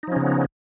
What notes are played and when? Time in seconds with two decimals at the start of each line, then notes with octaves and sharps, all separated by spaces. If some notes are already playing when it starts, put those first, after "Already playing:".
0.03 D#4
0.07 F3
0.12 C#4
0.16 C#3
0.21 B3